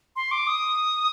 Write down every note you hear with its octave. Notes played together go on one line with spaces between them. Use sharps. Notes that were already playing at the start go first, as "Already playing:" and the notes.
C6
D6
D#6